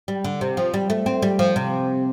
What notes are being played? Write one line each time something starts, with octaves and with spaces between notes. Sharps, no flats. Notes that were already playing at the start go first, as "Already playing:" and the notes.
G3
D3
C3
F3
G3
A3
C4
G3
F3
C3